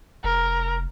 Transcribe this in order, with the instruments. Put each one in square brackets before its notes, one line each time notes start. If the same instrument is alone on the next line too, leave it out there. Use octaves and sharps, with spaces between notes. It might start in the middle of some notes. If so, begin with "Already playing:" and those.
[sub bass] F1 [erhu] A#4